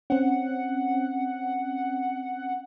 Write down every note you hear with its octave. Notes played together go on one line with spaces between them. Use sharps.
C4 C#4 F#5